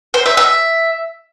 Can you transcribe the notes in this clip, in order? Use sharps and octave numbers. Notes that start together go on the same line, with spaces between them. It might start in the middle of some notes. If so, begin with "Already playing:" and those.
C5
E5
E5